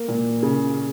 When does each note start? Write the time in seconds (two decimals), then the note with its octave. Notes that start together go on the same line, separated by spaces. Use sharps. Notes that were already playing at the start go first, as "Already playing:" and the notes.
Already playing: A#3
0.08 A#2
0.43 C#3